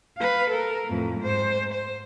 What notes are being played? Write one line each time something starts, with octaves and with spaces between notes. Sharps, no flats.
B4 F5
A4 A#4
F2 A2
G#2 C5
C5